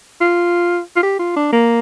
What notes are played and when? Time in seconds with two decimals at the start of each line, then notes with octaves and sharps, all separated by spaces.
0.21 F4
0.96 F4
1.03 G4
1.19 F4
1.36 D4
1.53 A#3